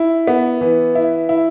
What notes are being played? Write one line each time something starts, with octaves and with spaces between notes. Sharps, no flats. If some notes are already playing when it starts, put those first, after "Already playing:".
Already playing: E4
B3
E3
E4
E4